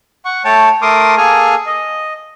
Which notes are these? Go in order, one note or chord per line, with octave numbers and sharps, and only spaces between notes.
F#5 C#6
A3 C#5 G5 A5
A3 A#4 C6 D6 D#6
A#3 G#4 A4 G#5 F6
D#5